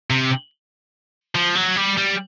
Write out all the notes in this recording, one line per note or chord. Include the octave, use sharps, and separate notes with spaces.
C3
F3
F#3
G3
G3